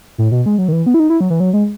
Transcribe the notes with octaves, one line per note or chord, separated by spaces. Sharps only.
A2
B2
G#3
F#3
D#3
E3
B3
E4
D#4
E4
F#3
E3
F#3
G#3